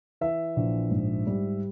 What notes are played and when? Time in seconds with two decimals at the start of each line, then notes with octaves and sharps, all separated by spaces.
0.21 E3 E5
0.56 A#1
0.91 G#2
1.27 G3